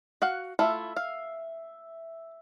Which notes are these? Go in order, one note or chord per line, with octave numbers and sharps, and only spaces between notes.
F#4 F5 F#5
A3 E4 F4 E5
F5